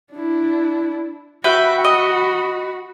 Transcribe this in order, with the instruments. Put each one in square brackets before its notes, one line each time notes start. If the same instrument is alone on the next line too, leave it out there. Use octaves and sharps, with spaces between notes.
[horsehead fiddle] D4 E4
[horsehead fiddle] F#4 B5 [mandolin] B4 E5 G5
[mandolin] D#5